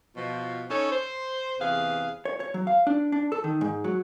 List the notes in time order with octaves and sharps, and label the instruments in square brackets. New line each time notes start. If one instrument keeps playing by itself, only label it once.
[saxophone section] B2 F3
C#4 D#4 A4 C#5
C5
E2 C3 G#4 B4 F5
[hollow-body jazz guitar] C#5
C#5
F#3
F5
D4
D4
A4
D#3
G#2
F#3